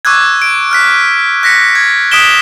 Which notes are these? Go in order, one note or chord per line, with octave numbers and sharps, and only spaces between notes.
C#6 D6 E6 F#6 G#6
D7
F6 F#6 B6
F#6 A#6 B6 C#7
G#6
D#6 F#6 B6 D7 E7 G7